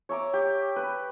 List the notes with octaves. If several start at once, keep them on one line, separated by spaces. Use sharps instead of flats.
C#5 E5 A#5 D6
G4
B4 B5